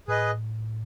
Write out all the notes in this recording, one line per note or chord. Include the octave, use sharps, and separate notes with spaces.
A2 G#4 B4 D#5